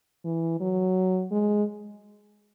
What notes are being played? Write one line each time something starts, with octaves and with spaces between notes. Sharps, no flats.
E3
F#3
G#3